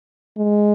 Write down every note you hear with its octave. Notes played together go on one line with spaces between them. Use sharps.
G#3